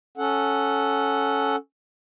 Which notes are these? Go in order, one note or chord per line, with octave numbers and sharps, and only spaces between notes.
C#4 A4 F#5